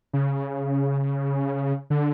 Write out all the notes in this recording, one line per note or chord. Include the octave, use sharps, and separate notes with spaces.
C#3
D3